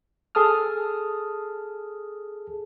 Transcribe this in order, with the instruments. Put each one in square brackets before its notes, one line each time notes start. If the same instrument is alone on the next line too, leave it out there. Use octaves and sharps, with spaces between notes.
[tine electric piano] G#4 A4 A5 D#6 F6